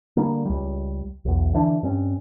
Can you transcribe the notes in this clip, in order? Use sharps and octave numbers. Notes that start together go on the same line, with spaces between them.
D3 G3 A#3
C#2 G3
B1 E2
D3 E3 D4
G2 C4 C#4